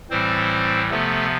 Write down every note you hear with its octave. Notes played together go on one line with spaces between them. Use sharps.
A2 E3 G3 C4 C5
C3 F3 A3 B3 A4